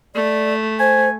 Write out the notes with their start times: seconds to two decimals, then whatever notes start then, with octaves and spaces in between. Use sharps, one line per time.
0.15 A3 D5
0.80 C5 G#5